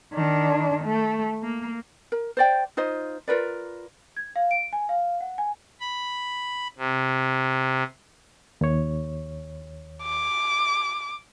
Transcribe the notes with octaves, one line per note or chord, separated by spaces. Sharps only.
D#3 D4
A3
A#3
A#4
C5 D5 G5
D#4 F4 C5 D#5
F4 A#4 B4 D5
G#6
F5
D7
G#5
F5
F#5
G#5
B5
C3
D#2 C#5
D6